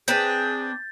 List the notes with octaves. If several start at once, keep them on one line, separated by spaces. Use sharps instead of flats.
C4 D4 G#4 B4 G6 A6